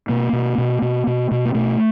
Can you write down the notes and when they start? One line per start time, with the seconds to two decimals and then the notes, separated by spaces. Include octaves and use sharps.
0.09 B2 A#3
0.33 B2
0.58 B2
0.82 B2
1.07 B2
1.31 B2
1.45 A#3
1.55 B2 A3